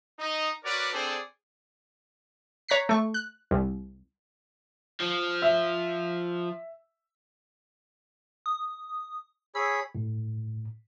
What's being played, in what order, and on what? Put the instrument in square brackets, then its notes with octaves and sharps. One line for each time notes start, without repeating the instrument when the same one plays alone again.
[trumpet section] D#4 D#5
F#4 A#4 B4 C#5 D5
C4 D4 G#4 A4 C5 D5
[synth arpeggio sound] C#5 A#5 F#6 B6 C7
A3 C#6
F#6
C2
[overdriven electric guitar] F3
[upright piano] E5
[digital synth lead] D#6
[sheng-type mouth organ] G#4 C#5 B5 [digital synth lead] E6
[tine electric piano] A2